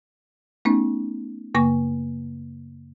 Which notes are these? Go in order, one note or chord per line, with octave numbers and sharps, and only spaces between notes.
A3 B3 C#4 D#4
F#2 C#3 A#3 C#6 A#6